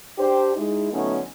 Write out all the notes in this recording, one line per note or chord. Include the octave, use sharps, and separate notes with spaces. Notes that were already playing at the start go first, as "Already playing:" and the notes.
D4 G4 C5
G#3 D#4 E4
D3 F#3 A3 B3 C#4 D#4